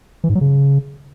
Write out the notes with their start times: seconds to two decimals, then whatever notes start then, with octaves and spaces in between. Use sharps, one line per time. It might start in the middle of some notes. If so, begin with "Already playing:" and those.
0.24 E3
0.29 G#2
0.35 F#3
0.41 C#3